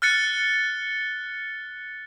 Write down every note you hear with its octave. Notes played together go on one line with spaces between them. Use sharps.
F6 F#6 A6 C#7